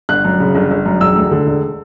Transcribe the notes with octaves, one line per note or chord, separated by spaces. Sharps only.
G1 F#6
F#2
C#3
G1
G1
F#2
E1 E6
D2
D3
E1